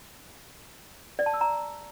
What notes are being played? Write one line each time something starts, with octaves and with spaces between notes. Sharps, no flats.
D5
A5
E6
A#5